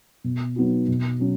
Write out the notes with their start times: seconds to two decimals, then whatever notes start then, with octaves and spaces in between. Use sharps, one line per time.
0.24 B2
0.56 F#3 B3 D#4 F#4
0.88 B2
1.20 F#3 C#4